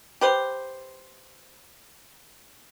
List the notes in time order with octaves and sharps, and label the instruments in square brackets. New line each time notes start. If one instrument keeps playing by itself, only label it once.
[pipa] G4 B4 C5